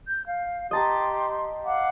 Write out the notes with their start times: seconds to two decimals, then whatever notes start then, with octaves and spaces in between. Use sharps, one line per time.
0.06 G6
0.27 F5
0.71 G4 D#5 A5 A#5 C6
1.65 F5 F#5 D6